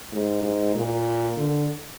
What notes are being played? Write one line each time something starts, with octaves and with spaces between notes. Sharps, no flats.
G#2
G#2
A#2
D3